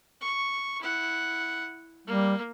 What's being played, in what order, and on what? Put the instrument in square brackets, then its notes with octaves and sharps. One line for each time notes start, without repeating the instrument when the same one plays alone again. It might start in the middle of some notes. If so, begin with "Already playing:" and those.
[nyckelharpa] C#6
E4 F#5
[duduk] G3 [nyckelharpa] A#3